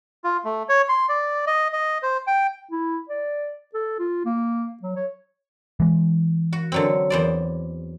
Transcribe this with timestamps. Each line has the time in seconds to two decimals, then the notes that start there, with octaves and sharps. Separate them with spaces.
0.24 F4
0.44 A3
0.69 C#5
0.89 C6
1.09 D5
1.47 D#5
1.73 D#5
2.03 C5
2.27 G5
2.72 E4
3.09 D5
3.74 A4
3.99 F4
4.25 A#3
4.83 F#3
4.96 C#5
5.80 E3 G#3
6.53 F#4
6.72 D3 F#3 C4
7.10 E2 C5 D5